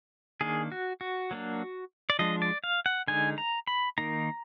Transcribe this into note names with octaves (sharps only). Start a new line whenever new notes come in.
D#3 A#3 D4 G#4
F#4
F#4
F#3 A#3 D4
D5
F3 G#3 D4 D#5
D5
F5
F#5
D3 G#3 D#4 G#5
A#5
B5
D#3 A#3 D#4 A#5